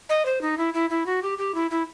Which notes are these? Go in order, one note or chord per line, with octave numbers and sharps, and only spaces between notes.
D#5
C5
D#4
E4
E4
E4
F#4
G4
G4
E4
E4